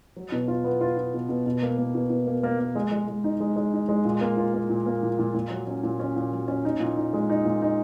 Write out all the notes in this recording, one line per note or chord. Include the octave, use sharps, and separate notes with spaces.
F#3
B2
F4
B3
F4
F4
B2
B2
B2
A#3
A#3
B2
B2
A#3
A#3
A#3
G#3
G#3
G#3
D#4
G#3
G#3
D#4
G#3
A#2
A#3
F4
A#3
A#2
A#3
A#2
A#2
A#2
F#3
C#4
A#2
C#4
A#2
F#3
C#4
D#4
A#2
D#4
G#3
D#4
A#2
D#4